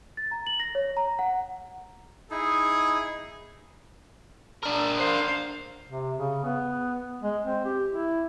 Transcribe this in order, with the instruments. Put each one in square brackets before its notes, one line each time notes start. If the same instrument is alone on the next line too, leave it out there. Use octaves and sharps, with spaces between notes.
[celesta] A6
A#5
F#7
A#6
C#5
A#5
F#5
[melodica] D#4 E4 [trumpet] G#4
[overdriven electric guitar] D4 A#4
[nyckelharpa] C5 F5
[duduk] C3
C#3
B3
G#3
C4
G4
E4